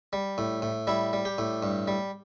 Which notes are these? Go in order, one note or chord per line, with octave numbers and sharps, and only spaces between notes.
G3
A2
A2
G3 E4
G3
G4
A2
G2
G3